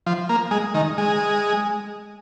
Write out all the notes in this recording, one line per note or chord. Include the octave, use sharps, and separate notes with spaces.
F3
A#3
G#3
D#3
G#3